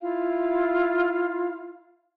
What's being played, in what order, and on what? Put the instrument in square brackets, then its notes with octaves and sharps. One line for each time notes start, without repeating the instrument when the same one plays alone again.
[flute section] E4 F4 F5